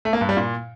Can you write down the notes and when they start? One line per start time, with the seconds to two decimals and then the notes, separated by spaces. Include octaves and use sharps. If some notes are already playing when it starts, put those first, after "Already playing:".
0.05 A3
0.13 A#3
0.21 G2
0.29 G3
0.37 A#2